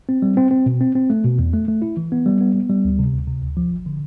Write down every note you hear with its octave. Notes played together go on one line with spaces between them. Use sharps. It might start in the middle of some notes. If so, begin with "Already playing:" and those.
C4
G3
C4
C4
B2
C4
C4
A3
B2
E2
A3
A3
E4
E3
B3
G3
B3
B3
G3
D2
C3
D2
C3
D2
F3
G1
D3